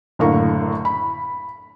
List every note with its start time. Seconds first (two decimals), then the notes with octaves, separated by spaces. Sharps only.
0.19 F#1 A2 D3 A#4 F5 C#6
0.85 B5